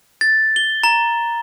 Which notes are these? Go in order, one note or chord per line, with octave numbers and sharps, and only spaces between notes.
A6
G7
A#5